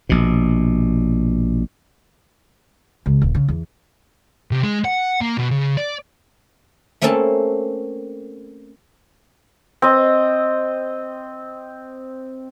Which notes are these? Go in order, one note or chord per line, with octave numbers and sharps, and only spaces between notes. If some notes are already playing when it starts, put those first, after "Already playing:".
A#1 B2
C#2
D#1
C#3
E2
C3
G#3
F#5
A#3
B2
C#3
D5
A3 A#3 C4 C#4 A4 A5
C4 D#5